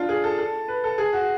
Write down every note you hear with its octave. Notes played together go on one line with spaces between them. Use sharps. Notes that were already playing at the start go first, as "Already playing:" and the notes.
Already playing: D4 F4
G#4
A4
A4
B4
A4
G#4
F#4